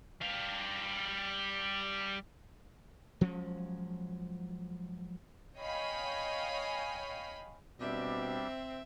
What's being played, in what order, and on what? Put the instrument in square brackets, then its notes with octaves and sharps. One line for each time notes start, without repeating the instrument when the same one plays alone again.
[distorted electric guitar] G3 F5
[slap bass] F3 F#3 G#3 C#4
[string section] C#5 D#5 F5 G5 G#5 B5
[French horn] B2 [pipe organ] G3 D4 G4 [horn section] C4 [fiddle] E5